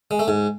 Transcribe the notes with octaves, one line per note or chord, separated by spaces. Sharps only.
G#3
A3
G#2